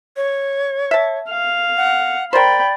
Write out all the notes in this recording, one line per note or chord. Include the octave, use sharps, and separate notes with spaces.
C#5
E5 A5
F5
F#5
A#4 C5 D5 G5 B5